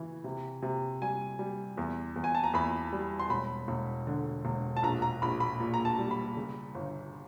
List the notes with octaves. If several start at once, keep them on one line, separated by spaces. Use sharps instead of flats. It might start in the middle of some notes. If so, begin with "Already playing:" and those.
Already playing: C#3 E3
C3
C3
G3 G#5
G3
E2
E2
G#5
A5
A#5
E2 B5
G3
C6
E1 B5
E1
D3
E1
A5
A#1 A#5
A#5
A#1 B5
B5
A#2
A#5
A5
G3
B5
C#3
G1